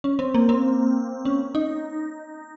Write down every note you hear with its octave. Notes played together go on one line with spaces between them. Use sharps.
C#4
C4
A#3
C4
C#4
D#4